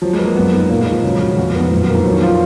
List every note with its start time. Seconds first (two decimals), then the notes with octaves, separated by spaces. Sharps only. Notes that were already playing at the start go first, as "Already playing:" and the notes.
0.02 F3 F#3
0.13 G#3
0.19 B4
0.25 A#3
0.36 F#2 B3
0.52 B3 D#4
0.69 A#2 A#3
0.81 G#3
0.86 A#2
0.92 F3
1.03 C#3 F#3
1.20 C#3 F#4
1.32 C#3
1.37 F2 B2
1.49 A#2
1.55 G#2 B3
1.71 F#2 A#2
1.83 B2
1.88 A#3
1.94 G#2
2.05 F3 F#3
2.12 D#3
2.20 F3 F4